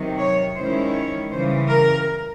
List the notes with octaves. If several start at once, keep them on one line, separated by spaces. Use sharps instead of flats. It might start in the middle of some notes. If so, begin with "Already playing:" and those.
Already playing: C3 D#3 F#3
C#5
D#3 G#3 C#4 E4 C5
C#5
C#3 E3 G3 C5
A#4